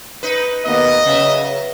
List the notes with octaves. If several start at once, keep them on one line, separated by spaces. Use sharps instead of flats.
D#4 B4
D#2 A#3 B3 D#5
C#3 F#3 B4 E5